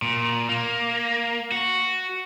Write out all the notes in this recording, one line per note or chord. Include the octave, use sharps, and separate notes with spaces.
A#2
A#3
F#4